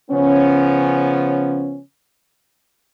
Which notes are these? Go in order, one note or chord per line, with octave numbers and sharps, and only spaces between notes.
C#3 F3 B3 C#4